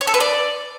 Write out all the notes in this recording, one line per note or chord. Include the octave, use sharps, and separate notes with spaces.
C#5
A4
B4
D5